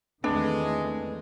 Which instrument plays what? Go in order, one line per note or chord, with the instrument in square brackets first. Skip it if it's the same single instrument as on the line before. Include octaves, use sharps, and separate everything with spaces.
[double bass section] E2 D#3 A3 [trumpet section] G#3 [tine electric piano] C4 B4 [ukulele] D4